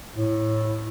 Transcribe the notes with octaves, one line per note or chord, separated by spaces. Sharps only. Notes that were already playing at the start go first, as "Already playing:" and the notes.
A2